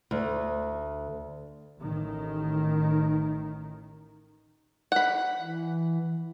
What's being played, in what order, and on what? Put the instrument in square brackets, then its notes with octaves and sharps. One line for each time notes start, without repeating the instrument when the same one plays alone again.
[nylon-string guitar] D2
[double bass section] A1 D#3
[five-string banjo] F#5 B5
[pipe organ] E3